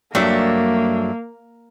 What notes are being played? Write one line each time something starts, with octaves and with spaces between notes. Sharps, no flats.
G2 F#3 A3 A#3 D4 E5